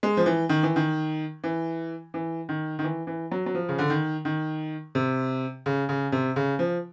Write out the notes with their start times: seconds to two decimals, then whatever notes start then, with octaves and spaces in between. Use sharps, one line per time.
0.03 G#3
0.17 F3
0.26 E3
0.49 D#3
0.63 E3
0.76 D#3
1.44 E3
2.14 E3
2.49 D#3
2.79 D#3
2.84 E3
3.07 E3
3.31 F#3
3.46 F#3
3.54 F3
3.69 C#3
3.79 D3
3.90 D#3
4.25 D#3
4.95 C3
5.66 C#3
5.89 C#3
6.12 C3
6.36 C#3
6.59 F3